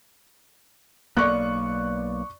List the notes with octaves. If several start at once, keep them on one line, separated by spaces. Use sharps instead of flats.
B1 A#3 B3 D5 C#6 F#6